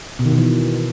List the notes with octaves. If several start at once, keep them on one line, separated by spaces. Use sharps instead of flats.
B2
D#3
B2
E3